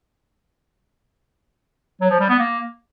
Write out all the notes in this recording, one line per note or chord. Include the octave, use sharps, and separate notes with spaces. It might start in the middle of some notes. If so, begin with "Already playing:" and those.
F#3
F3
G3
B3
A#3